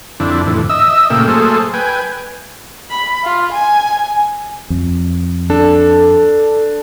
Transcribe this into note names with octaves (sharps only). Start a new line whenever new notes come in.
F2 D3 C4 D4 E4
F2 A2 D3 E3
D#5 E5 E6
A#2 C#3 A3 A#3 G5 E6
F#3 A3 A#3 G#4 A4 C5
B4 G5 G#5
B5
F4
G#5
F2
D4 A4